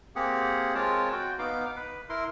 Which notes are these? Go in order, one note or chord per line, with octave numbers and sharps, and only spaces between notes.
A#3 C4 G4 G#4 F#5
G#3 C4 F4 A#4 C#5 A5
F#4 G5
B3 D#4 F5 D6
B4
E4 A#4 C6